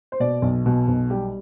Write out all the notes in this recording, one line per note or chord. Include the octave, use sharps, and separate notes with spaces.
C5
B2 D5
B1
B2
B1
G3 G4